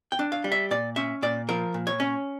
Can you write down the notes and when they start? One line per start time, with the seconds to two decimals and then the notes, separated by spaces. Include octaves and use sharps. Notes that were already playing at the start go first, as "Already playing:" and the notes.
0.12 G5
0.19 D4
0.32 F5
0.44 G3
0.52 E5
0.71 A#2 D5
0.96 C#4 E5
1.22 A#2 D5
1.49 F3 A#4
1.74 A#2
1.87 C#5
2.00 C#4